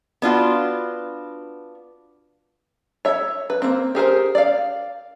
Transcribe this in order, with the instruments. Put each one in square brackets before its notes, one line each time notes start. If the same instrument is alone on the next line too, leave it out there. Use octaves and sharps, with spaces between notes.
[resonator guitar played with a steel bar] B3 D4 F4 F#4
[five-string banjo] C#5 E5
B4
A#3 C4
G4 G#4 A#4 C5
D5 F5